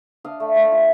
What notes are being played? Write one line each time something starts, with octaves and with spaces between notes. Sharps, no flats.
D4 D#5 F5
A3
A3
F4